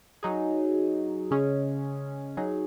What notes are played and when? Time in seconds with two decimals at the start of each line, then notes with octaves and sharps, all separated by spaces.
0.23 F#3 D#4 G#4
1.31 C#3 G#3 C#4 G#4
2.37 F#3 D#4 G#4